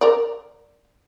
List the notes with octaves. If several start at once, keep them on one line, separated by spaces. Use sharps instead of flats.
A#4 D5